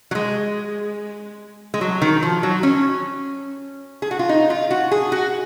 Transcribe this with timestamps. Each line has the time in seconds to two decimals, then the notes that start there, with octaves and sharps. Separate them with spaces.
0.11 F#3
0.15 G#3
1.74 G#3
1.81 F#3
2.02 D#3
2.23 F3
2.43 F#3
2.63 C#4
4.02 G#4
4.11 F#4
4.19 F4
4.29 D#4
4.50 F4
4.71 F#4
4.91 G#4
5.12 F#4